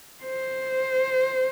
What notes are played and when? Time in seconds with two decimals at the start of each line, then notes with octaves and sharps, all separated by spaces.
0.24 C5